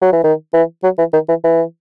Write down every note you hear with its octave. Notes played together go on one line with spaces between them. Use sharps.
F#3
E3
D#3
E3
F#3
E3
D#3
E3
E3